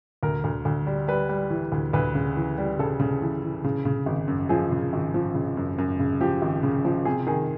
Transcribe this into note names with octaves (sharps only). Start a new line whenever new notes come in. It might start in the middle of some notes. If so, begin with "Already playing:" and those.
D2 A#4
D2
D2
G3
G3 B4
G3
E3
D2
D2 B4
C#3
E3
G3
C#3 A4
C#3
E3
E3
C#3
C#3
G#1
F#2
F3 G#4
C#3
G#1
F3
C#3
F#2
F#2
C#3
F3 G4
G#1
C#3
F3
C3 G#4
D#3 G#4